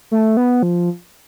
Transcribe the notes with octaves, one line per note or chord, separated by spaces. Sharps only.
A3
B3
F3